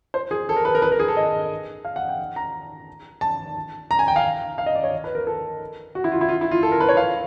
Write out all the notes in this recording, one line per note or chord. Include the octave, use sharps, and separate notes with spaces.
C5
G#4
A4
A#4
B4
A#4
B4
A#4
G#4
A4
D#5
F5
F#5
G5
A#5
A5
A#5
G#5
G5
F5
F5
D#5
D5
C#5
B4
A#4
A4
F#4
E4
F4
E4
F4
E4
F4
A4
A#4
B4
C#5
F5